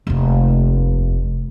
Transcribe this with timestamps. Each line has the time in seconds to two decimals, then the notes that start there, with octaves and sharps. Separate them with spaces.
0.07 F1 D#2